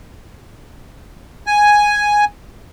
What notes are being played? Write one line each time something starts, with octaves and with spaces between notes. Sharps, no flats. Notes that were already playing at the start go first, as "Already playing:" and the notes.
G#5